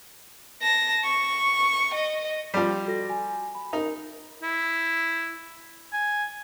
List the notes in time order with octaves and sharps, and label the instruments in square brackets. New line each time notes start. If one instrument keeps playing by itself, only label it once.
[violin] A5 A#6
C#6
D#5
[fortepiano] F3 G3
[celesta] F#4 A4 A#6
G#5
B5
[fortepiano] D#4 [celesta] A#4
[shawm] E4
G#5